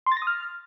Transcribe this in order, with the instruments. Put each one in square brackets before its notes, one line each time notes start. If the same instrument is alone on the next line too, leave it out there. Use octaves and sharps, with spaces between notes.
[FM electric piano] C6
A6
A#6
D#6
F6